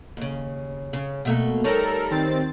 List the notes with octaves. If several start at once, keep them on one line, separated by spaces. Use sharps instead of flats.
D#2 C#3
C#3
B2 A3 A#3
G3 D#4 A4 A#4 C#5 A#5
D#3 C4 A6